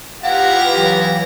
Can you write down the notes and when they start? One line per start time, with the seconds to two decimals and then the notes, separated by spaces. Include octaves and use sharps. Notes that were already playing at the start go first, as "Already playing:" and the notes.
0.23 B3 E4 F4 G4 B4 F5 F#5 A#5
0.74 E3 F#3